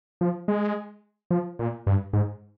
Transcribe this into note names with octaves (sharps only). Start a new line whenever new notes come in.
F3
G#3
F3
A#2
G2
G#2